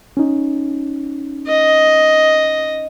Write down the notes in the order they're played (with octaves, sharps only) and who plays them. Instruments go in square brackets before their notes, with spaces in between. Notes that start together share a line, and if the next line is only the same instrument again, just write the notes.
[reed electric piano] C#4 D#4
[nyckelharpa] D#5